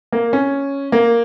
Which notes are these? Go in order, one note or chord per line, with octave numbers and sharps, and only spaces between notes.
A#3
C#4
A#3